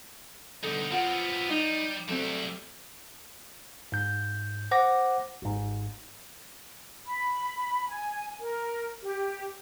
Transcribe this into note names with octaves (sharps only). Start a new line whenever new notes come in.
B2 D3 G3 D#4 A4
B3 C4 F4 F#5
G3 D#4
F#3 G3 A3 C4 E5
G#2 G6
C5 F#5 D6 A#6
G#1 G#2
B5
G#5
A#4
G4